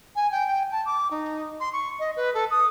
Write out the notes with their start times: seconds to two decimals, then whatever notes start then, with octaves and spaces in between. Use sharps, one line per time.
0.16 G#5
0.32 G5
0.47 G5
0.72 A5
0.85 D6
1.11 D#4
1.60 C6
1.73 C#6
1.99 D#5
2.16 B4
2.34 A4
2.50 D#6